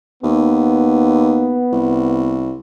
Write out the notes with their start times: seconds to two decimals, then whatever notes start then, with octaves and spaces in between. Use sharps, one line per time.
0.23 D#2 B3
1.73 C2